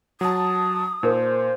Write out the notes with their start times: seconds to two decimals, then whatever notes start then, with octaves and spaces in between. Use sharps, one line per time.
0.21 F#3 A5 D#6
1.03 A#2 D#4 A#4 C5